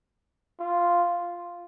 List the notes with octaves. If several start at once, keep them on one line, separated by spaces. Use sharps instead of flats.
F4